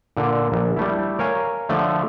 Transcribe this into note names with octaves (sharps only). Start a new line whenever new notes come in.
A#2 D3
A#1
G3 A3 E4
A#4 C#5 F5 G#5
D3 F3 A3